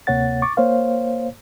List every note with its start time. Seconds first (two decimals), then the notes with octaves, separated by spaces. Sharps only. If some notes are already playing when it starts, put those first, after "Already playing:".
0.07 D2 C3 A#3 C#5 F#5 A6
0.42 C#6 D6 A6
0.57 A#3 C5 C#5 F5